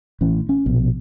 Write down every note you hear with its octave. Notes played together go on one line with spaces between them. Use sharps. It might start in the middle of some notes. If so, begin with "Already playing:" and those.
A1 E3 C#4
C#4
A#1 B2